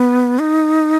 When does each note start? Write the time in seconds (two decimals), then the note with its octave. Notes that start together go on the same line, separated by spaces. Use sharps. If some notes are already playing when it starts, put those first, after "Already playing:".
Already playing: B3
0.39 D#4